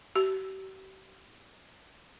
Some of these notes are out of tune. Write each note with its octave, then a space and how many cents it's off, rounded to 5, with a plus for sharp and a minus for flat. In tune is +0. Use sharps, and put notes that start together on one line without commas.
G4 -45